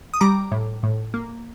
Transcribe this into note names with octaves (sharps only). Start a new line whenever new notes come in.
D#6
G3 A#5 D6
A2
A2
A#3